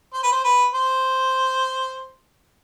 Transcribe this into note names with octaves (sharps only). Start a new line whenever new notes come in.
C5
B4
C5
B4
C5